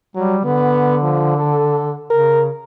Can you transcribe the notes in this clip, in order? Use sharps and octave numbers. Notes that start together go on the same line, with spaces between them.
F#3 G3
D3 B3
F3
A4
C#3 A#4